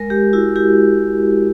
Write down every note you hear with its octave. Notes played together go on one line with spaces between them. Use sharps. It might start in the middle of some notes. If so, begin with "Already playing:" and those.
Already playing: G#3 A#4
G#3 G4
E4 F#4
E4 G4